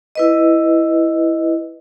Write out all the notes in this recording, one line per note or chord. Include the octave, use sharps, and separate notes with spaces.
E4 B4 D#5